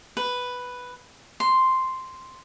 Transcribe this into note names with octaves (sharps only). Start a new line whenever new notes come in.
B4
C6